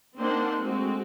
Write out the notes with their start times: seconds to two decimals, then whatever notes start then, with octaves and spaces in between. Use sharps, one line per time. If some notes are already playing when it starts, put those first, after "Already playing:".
0.17 A#3 C4 D4 D#4 C5 F#5
0.58 G#3 A3 C4 F#4